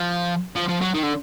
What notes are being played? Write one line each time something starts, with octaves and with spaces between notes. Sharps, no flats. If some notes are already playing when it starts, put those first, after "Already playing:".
Already playing: F3
F3
F3
F#3
D#3
D3